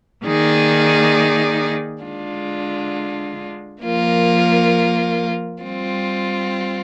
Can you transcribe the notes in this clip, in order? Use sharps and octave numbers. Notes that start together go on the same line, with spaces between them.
D#3 A#3 D#4 G#4 D5
D3 G#3 D4 F4
F3 A#3 F4 A#4
G3 C4 F4